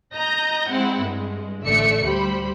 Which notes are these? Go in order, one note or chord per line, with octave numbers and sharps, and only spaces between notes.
D#5 A#5 G6 A#6
G#3 C4 E4 F#5
G2 G#3
A1 D3 A3 D5 E5 C#7
D2 G3 G4 C5 B5